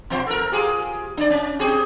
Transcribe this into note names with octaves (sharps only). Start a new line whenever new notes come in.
B2 F3 C5
A4 A#4
F4 G4 G#4
D4 D5
C#4
C4 G4 G#4